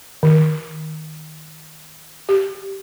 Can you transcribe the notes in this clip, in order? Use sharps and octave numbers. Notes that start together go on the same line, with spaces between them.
D#3
G4